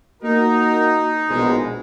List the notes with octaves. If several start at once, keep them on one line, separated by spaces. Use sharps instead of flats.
A#3 D#4 F#4 A#4
A#1 B2 G#3